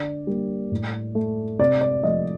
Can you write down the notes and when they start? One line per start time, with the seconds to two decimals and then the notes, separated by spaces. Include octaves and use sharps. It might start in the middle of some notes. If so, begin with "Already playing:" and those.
Already playing: D3 D5
0.27 G3 A#3
0.72 A2
1.15 A3
1.59 C3 D5
1.81 D5
2.03 F3 A3 D#5